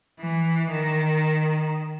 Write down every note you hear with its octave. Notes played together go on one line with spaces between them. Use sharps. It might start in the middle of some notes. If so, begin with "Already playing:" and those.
E3
D#3